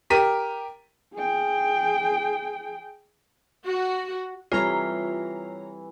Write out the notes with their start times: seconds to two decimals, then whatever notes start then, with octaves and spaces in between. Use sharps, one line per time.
0.10 G4 A#4 B6 D#7
1.14 G#4 G5
3.66 F#4
4.52 E3 G3 C4 F4 A4 C#5 A#5